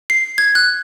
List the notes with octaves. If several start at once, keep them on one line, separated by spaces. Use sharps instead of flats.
C7
G#6
F#6